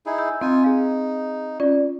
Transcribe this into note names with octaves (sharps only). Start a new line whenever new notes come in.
D#4 E4 G#4
E6 G6
C4 D#4 F4 G#5
D#4 G#4 F5
C#4 F4 D5